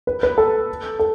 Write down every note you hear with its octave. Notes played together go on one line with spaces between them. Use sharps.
B4
B4
A4
A4